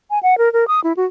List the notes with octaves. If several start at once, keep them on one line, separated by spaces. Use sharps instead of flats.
G#5
F#5
A#4
A#4
D#6
E4
F#4